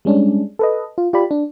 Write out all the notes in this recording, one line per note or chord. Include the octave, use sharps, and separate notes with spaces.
G3 G#3 C#4 D4
A4 B4 D#5
F4
F4 G4 D5 B5
D4